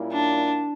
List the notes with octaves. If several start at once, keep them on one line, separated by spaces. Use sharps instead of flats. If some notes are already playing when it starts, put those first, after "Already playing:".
Already playing: A#2 G3 A#3 C#4 E4
D4